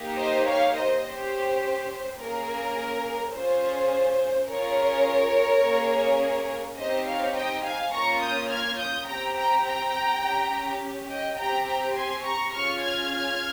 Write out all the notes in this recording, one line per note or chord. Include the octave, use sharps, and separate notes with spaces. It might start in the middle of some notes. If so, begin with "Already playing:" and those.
Already playing: A#3 D#4 G4
C5 D#5
C#5 F5
C5 D#5
C#4 G4 C5
A#3 C#4 G#4 A#4
C#4 F4 G#4 C5
C#4 F4 G#4 A#4 C#5
A#3 C#4 G#4
C4 D#4 G4 C5 D#5
C#5 F5
D#5 G5
F5 G#5
A#3 C#4 F4 A#5 C#6
D#6 G6
F6 G#6
D#6 G6
C4 G4 G5 A#5
G5 A#5
G5 A#5
C#4 G4
D#5 G5
C4 G4 G5 A#5
G5 A#5
G#5 C6
A#5 C#6
C#4 F4 G#4 C#6 F6
F6 G#6